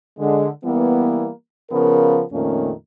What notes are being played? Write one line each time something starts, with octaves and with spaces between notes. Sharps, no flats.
D3 G#3
E3 G3 A#3 B3
C#3 F3 B3 A#4
F2 A#2 D#3 A3 A#3 C#4